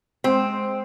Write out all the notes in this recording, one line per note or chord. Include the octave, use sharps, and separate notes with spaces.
G#3 C4 C5 G5